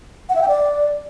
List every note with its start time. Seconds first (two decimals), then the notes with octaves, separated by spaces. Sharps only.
0.29 F#5
0.36 E5
0.42 G5
0.48 D5